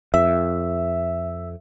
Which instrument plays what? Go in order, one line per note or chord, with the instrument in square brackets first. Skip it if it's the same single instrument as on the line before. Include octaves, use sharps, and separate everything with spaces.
[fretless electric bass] F2 [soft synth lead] E5